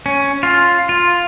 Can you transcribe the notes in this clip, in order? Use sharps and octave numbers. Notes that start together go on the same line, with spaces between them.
C#4
F4
F4